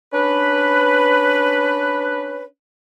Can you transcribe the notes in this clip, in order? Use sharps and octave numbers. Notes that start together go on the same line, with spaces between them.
C#4 D4 B4